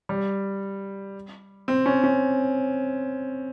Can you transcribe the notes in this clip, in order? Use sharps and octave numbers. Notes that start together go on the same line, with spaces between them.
G3
C4
C#4
C#4